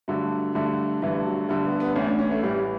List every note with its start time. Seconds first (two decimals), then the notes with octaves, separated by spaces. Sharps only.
0.08 G2 D3 F#3 A3
0.55 G2 D3 A3
1.02 G2 D3 E3 A3
1.25 F#3
1.49 G2 D3 G3 A3
1.65 B3
1.80 B3
1.96 A1 A2 E3 C#4
2.07 D4
2.19 C#4
2.31 A3
2.43 A1 A2 E3 G3